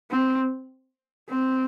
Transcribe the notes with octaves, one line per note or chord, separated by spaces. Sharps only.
C4
C4